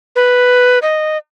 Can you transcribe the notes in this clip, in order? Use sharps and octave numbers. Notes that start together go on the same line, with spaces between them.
B4
D#5